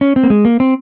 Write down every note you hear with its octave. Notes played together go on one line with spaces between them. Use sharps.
C#4
C4
A#3
G#3
A#3
C4